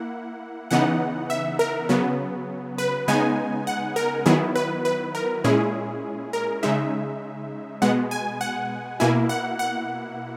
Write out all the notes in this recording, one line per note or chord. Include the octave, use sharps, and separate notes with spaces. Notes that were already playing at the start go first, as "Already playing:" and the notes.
Already playing: A#3 E4 F#5
C#3 E3 B3 D#4 F#5
E5
A#4
C#3 F#3 B3
B4
C#3 G#3 B3 D#4 G#5
F#5
A#4
D#3 F#3 B3 E4 G#4
B4
B4
A#4
A#2 G#3 C#4 E4 G#4
A#4
C#3 G#3 D#4 E5
B2 G#3 B3 F#5
G#5
F#5
B2 A#3 E4 G#5
F#5
F#5